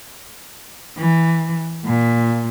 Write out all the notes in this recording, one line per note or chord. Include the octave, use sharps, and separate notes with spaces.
E3
A#2